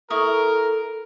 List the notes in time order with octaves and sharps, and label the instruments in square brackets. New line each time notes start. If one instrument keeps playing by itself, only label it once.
[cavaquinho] E4 C#6 D#6 [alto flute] A4 [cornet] A#4